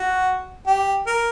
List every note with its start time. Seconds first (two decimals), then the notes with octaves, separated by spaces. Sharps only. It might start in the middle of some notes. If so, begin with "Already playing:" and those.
Already playing: F#4
0.67 G4
1.07 A#4